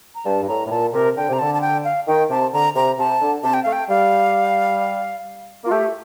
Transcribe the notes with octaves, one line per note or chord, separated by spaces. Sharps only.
A#5
G2 A5
G2
A2 A#5
A2
A#2 A5
C3 A#4
D3 G5
C3 A#5
D3 A5
A5
G5
F5
D#3 G5
C3 A5
D3 A#5
C3 A#5
C3 A5
D3
C3 A5
G5
A3 F5
G5
G3 F5
A#3 F4
A3 G4